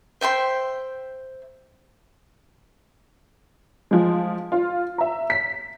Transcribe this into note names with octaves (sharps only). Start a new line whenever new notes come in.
C5 E5 G5 C6
F3 G#3
F4
E5 A#5
B6